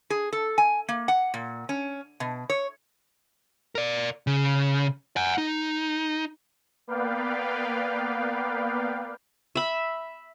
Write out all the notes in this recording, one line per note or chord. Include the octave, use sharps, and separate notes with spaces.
G#4
A4
G#5
A#3
F#5
A#2
C#4
B2
C#5
A#4 D5
C#3
F#5 G#5
D#4
A#3 B3 B4 D5 F5 G5
E5 B5